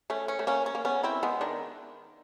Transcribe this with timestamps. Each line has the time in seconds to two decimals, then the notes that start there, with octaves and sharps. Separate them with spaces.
0.10 A3 C#4
0.28 C#4
0.39 A3
0.47 A#3 C#4
0.66 C#4
0.75 A#3
0.85 B3 C#4
1.03 C4 E4
1.23 G#3 B3
1.41 D#3 D4